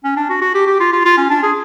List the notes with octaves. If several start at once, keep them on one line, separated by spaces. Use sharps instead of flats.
C#4
D4
F#4
F#4
G4
G4
F4
F4
F4
C#4
D4
G#4